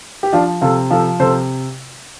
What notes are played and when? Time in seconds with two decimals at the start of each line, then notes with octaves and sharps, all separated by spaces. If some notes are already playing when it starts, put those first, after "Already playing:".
0.23 G4
0.32 F3 D4 F4
0.61 C3 F4 A4
0.90 F3 F4 A4
1.20 C3 A4 C5